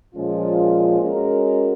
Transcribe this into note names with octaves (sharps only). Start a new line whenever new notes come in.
A#2 F3 G#3 C#4 F4
G#3 C#4 F#4 A#4